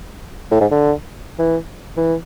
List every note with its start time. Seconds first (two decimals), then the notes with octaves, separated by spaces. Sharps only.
0.51 A2
0.61 G#2
0.71 D3
1.39 E3
1.97 E3